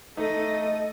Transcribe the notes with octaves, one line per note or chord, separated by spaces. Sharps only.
A3 D#4 A4 D#5